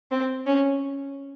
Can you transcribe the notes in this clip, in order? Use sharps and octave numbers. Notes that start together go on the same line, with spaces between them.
C4
C#4